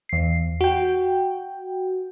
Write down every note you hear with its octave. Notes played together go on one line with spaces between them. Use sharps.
E2 C7
F#4 G5